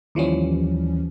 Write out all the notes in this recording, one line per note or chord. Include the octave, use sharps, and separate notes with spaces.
D#2 E3 F3 G3 C#4